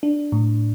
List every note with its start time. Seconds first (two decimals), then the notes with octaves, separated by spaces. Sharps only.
0.03 D4
0.32 A2